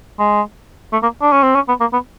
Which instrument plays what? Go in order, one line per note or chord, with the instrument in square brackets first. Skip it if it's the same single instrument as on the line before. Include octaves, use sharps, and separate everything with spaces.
[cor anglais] G#3
A3
A#3
D4
C#4
C4
C#4
B3
A#3
B3